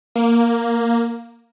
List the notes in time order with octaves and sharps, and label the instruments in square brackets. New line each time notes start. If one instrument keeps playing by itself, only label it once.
[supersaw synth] A#3